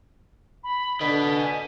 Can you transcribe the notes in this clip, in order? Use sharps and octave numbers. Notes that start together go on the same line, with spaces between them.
B5
D3 B4 D#5 B6
G#5